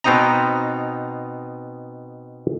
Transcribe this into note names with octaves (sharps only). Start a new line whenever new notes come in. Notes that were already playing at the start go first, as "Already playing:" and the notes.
B2 B3 C4 D#4 D#5 A#5